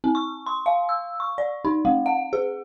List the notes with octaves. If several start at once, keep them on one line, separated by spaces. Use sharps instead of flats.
C4
C#6
C6
F5
E6
C#6
D5
D#4
A3
F#5
G#4